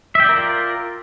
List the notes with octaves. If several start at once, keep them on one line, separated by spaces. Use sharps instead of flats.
F4 A#4 D5 E5 G5